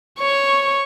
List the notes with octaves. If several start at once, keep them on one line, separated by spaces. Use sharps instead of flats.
C#5 C#6